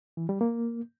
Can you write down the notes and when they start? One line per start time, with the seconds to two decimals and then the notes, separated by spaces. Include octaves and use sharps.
0.17 E3
0.29 G3
0.41 A#3